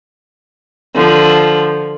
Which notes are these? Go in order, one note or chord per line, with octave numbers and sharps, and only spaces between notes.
D3 F3